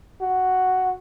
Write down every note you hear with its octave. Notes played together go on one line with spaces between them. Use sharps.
F#4